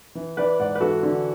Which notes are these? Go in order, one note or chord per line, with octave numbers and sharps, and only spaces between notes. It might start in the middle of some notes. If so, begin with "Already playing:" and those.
E3
E3 B4 D5
G#2 D5 F#5
B4
E3 F#4 A4
D3